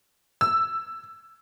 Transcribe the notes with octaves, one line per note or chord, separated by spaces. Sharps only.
E6